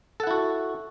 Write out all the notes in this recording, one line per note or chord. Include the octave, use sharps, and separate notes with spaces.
E4 F#4 A4 F#5